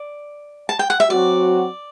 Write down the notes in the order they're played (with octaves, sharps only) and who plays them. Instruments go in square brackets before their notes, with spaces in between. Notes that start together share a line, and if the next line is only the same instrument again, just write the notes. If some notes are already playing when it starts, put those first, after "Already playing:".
Already playing: [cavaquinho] D5
A5
G5
F#5
E5
[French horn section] F#3 C4 F#4 [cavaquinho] D5